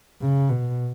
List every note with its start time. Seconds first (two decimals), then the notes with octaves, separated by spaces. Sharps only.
0.21 C#3
0.49 B2